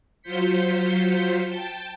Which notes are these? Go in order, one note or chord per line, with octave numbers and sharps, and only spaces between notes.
F#3 F4 C5 G6 B6 C#7
G5 A5